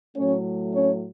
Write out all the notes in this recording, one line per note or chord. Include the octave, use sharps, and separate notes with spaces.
A2 F#3 A3 C#4 C#5
C#4 C#5